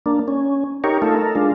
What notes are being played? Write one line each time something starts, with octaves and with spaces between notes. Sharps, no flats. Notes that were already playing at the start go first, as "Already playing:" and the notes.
A#3 D4
C#4
D#4 G4 A#4 C#5
A3 D#4 F4 A4
A4 A#4
G#3 D4 F4